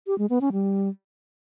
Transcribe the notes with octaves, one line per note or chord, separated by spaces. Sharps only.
G4
G#3
B3
C#4
G3